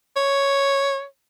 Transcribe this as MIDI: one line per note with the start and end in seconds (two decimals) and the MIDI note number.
0.16 1.04 73